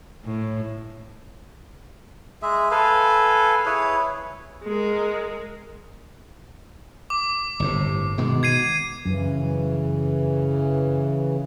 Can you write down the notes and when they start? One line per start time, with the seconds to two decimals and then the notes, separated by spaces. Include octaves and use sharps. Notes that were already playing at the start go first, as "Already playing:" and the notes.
0.25 A2
2.42 G#3 G#4 E5
2.71 A4 B4 F5 G#5
3.66 E4 G#4 B4 C#5
4.64 G#3 A#4
7.10 D6
7.60 G1 A2 C3
8.18 B2 D#3 G#3
8.43 G#6 C7 D#7
9.05 F#2 C#3 E3